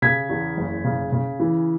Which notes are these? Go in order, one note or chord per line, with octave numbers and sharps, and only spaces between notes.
C#3 G#6 B6
E2
F#1
C#3
C#3
E3